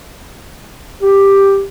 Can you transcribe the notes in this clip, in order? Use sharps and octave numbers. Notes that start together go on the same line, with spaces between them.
G4